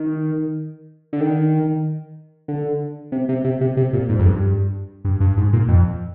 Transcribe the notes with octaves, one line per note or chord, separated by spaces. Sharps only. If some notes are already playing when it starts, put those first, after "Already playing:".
Already playing: D#3
D3
D#3
D3
C3
C3
C3
C3
C3
A#2
G#2
F2
G2
G2
G2
G#2
A#2
F2